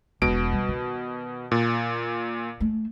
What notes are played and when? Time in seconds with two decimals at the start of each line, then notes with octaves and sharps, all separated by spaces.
0.22 E1 B2 D7
0.52 G3
0.69 D#3
1.51 A#2
2.60 A3